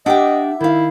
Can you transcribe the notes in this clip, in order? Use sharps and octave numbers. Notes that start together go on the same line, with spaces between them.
D4 G4 D#5 E5 F#5 G5 D6
D#3 E4 F5